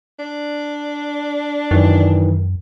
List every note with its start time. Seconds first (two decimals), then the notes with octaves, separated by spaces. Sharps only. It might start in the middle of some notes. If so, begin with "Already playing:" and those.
0.19 D4
1.71 F#2 D#3 E3 F#3